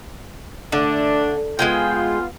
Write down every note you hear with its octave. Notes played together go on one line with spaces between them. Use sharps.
D3 A3 D4
G#3 B3 F4 G#4 G5